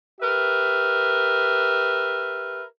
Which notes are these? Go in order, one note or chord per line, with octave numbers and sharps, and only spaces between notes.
G4 A#4 B4 E5